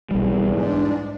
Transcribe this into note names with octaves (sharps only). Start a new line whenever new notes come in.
B1 E2 G3
G#2 D4